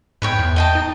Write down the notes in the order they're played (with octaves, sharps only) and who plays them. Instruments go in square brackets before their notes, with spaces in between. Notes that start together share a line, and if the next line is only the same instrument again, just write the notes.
[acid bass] G#2 [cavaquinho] B4 C#5 G5
[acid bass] E2
[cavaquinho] D#5 G5 A5
[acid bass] D#4